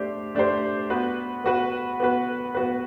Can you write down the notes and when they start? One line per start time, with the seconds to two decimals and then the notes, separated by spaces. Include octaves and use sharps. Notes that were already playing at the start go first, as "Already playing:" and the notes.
Already playing: A3 D4 G4 C5
0.35 A3 D4 G4 C5
0.90 B3 F#4 B4
1.44 B3 F#4 B4
2.00 B3 F#4 B4
2.55 B3 F#4 B4